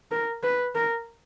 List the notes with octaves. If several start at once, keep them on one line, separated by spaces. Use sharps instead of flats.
A#4
B4
A#4